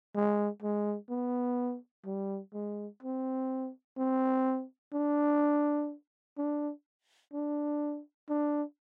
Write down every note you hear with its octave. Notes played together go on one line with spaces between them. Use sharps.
G#3
G#3
B3
G3
G#3
C4
C4
D4
D4
D4
D4